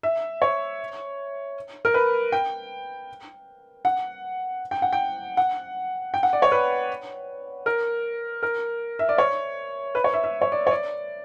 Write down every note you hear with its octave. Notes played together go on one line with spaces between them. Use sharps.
E5
C#5
A#4
B4
G5
F#5
G5
F#5
G5
F#5
G5
F#5
D5
C#5
B4
A#4
A#4
E5
D5
C#5
B4
C#5
E5
E5
C#5
D5
C#5
D5